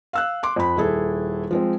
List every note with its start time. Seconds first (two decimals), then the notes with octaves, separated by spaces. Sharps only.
0.13 F5 E6 F#6
0.43 C6 D6
0.56 F2 B5
0.77 D#1 E4 G#4 A4
1.51 F3 G#3 C4